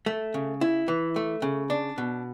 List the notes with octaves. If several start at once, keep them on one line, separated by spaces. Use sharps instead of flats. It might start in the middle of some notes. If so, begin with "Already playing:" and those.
A3
C#3
E4
E3
A3
C#3
D4
B2